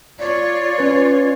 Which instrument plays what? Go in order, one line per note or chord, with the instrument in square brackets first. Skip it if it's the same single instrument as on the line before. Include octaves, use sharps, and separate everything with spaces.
[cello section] F4 C#5 [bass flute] D5
[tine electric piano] C#4 B4